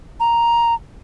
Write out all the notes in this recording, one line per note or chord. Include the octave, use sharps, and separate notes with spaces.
A#5